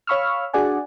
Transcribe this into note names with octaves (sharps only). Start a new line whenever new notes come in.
C#5 F5 B5 C#6 E6 F6
D4 F#4 G#4 D5 F#5 G#5